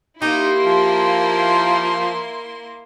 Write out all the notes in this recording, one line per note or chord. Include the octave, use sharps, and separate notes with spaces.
A#3 D#4 E4 G4 C6
F3